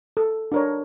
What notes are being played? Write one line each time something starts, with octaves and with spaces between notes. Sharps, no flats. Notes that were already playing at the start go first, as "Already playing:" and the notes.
A4
D4 A#4 C#5